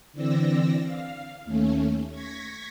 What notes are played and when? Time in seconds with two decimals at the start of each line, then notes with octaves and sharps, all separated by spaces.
0.13 D3 E3 C4 D5 E6 A#6
0.83 F5
1.45 D#2 A3 C#4
2.11 C#6 G#6 A#6 B6